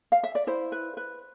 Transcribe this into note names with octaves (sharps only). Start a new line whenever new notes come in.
F5
E5
D5
E4 C5
B4
B4